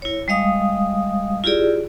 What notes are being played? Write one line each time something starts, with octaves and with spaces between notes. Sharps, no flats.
E4 C#5
G3 G#3 D#5 F5 D#6
E4 F4 G4 G#4 D5